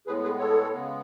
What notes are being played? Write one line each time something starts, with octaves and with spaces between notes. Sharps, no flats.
A2 G#3 B3 G#4 B4
G#4 B4
A4 C#5
C#3 G#3 B3